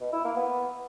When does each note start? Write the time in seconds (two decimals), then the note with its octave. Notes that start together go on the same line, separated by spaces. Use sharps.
0.01 B2
0.12 E4
0.24 A#3
0.36 B3